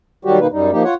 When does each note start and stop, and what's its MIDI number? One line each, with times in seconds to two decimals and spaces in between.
0.25 0.39 51
0.25 0.39 54
0.25 0.39 55
0.25 0.39 66
0.25 0.39 67
0.40 0.47 47
0.40 0.47 51
0.40 0.47 58
0.40 0.47 63
0.40 0.47 71
0.52 0.71 42
0.52 0.71 55
0.52 0.71 63
0.72 0.83 53
0.72 0.83 58
0.72 0.83 63
0.72 0.83 67
0.84 0.95 65
0.84 0.95 73
0.84 0.95 78